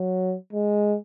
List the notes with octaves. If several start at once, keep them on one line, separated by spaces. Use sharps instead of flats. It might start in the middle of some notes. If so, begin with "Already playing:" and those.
Already playing: F#3
G#3